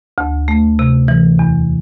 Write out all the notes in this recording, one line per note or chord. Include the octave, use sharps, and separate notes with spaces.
D2
A3
C3
E3
E2